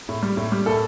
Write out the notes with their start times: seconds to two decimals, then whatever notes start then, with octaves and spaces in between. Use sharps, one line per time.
0.09 A2
0.23 G3
0.37 A2
0.52 G3
0.66 A2 A4